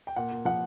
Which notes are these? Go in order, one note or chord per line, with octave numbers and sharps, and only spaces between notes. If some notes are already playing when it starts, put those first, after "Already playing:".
G5
A#2 F#5
A#2
F3 F#5